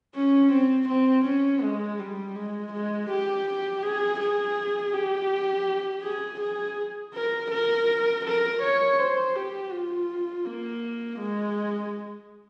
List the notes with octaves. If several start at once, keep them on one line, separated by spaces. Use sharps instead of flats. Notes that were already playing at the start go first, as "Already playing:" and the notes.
C#4
C4
C4
C#4
G#3
G3
G#3
G#3
G4
G#4
G#4
G4
G#4
G#4
A#4
A#4
A#4
C#5
C5
G4
F4
A#3
G#3